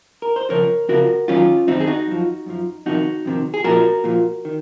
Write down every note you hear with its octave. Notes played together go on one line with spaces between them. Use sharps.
A#4
C5
F2 C#3 F3 A#4 C#5
F2 C#3 F3 F#4 A#4
F#2 D#3 F#3 C#4 F4
F#2 D#3 F#3 C4 D#4
G#4
D#4 F#4
F#2 F3
F#2 F3
F2 C3 D#3 D#4 F#4
F2 C3 D#3
G#4
A#2 F3 F#4 A#4
A#2 F3
D#3